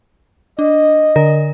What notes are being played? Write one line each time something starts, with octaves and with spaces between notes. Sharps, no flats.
D4 D#5
D3 A#4